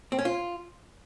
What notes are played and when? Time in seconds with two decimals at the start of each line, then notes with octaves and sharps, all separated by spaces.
0.12 C4
0.19 C#4
0.25 F4